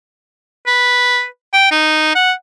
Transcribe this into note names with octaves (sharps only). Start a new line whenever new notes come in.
B4
G5
D#4
F#5